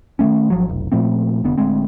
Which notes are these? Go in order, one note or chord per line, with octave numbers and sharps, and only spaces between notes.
D#3 F3 A3 C#4
G#1 F3 F#3
F1 B1
A#2 F3 A3 C4
F1 D3 B3
D1 D2 G#3 C4